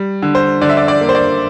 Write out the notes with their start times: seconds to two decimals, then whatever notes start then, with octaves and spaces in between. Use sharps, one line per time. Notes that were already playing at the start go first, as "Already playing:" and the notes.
Already playing: G3
0.22 D3
0.35 C5
0.61 D3 D5
0.70 E5
0.77 D5
0.88 D5
1.01 A#3
1.09 C5
1.15 D5